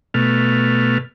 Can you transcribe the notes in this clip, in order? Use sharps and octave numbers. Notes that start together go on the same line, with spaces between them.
B2 A3 F6